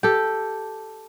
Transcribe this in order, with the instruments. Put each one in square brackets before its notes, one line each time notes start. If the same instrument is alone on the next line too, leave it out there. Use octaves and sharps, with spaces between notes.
[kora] G4 A4